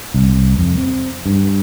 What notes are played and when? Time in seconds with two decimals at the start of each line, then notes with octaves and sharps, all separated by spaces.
0.14 C2
0.58 F2
0.78 C4
1.26 G2